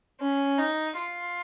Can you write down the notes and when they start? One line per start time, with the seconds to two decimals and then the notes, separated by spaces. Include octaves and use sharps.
0.20 C#4
0.58 D#4
0.97 F4